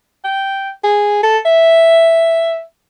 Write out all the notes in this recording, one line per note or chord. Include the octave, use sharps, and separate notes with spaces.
G5
G#4
A4
E5